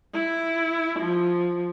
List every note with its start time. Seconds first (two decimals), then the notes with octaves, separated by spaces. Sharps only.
0.14 E4
0.99 F3